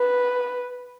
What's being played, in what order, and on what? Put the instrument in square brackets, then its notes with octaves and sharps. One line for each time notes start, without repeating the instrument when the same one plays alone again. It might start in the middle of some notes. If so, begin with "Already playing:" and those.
Already playing: [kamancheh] B4